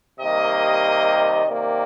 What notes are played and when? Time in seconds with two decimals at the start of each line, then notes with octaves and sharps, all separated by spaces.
0.20 C3 D#3 G3 A#3 D#5
1.46 C3 D#3 A#3 D5